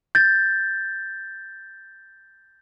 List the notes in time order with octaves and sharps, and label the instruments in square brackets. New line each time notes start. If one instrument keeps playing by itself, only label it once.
[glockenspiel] G6 A6